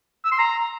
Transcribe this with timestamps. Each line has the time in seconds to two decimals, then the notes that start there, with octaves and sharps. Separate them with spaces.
0.25 E6
0.32 C6
0.39 A#5